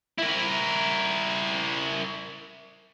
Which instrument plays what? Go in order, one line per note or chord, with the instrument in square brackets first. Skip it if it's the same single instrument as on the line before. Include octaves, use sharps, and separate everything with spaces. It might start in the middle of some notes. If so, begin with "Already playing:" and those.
[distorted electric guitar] E4 A#4